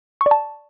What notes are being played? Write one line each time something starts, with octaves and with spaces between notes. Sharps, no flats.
C#6
D5
A5